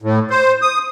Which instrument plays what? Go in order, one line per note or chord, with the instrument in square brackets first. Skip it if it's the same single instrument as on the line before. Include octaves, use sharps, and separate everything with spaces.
[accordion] A2
C5
D#6